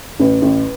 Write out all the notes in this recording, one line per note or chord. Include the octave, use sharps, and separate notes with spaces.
A1 B4
A1